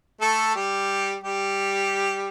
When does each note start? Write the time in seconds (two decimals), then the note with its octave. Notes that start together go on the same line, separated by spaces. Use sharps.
0.21 A3 A4
0.55 G3 G4
1.24 G3 G4